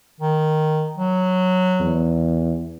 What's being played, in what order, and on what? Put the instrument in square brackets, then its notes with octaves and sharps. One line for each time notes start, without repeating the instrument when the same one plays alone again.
[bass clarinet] D#3
F#3
[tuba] E2